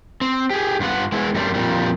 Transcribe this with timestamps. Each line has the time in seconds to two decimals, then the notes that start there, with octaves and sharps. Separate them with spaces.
0.21 C4
0.50 G4 G#4
0.80 G2 B3 F4 F#5
1.12 G#3 B3 E4
1.35 F#2 G3 A3 C4
1.55 F2 A#2 G3